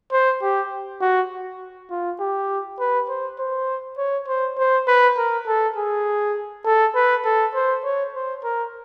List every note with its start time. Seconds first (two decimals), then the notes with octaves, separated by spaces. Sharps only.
0.12 C5
0.42 G4
1.01 F#4
1.90 F4
2.20 G4
2.79 B4
3.09 C5
3.39 C5
3.98 C#5
4.28 C5
4.58 C5
4.88 B4
5.17 A#4
5.47 A4
5.76 G#4
6.66 A4
6.95 B4
7.25 A4
7.55 C5
7.84 C#5
8.14 C5
8.44 A#4